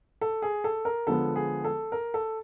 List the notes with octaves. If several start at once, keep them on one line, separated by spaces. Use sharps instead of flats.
A4
G#4
A4
A#4
D3 F3 G#3 B3 A4
G#4
A4
A#4
A4